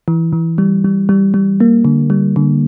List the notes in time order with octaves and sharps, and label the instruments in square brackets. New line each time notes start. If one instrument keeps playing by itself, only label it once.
[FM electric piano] E3
E3
G3
G3
G3
G3
A#3
D3
G3
D3